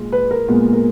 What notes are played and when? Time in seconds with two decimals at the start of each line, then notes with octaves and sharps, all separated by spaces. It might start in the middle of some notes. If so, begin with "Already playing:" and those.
Already playing: A#2 G#3
0.12 B4
0.31 A#4
0.48 A#2 G#3 B3
0.73 A#4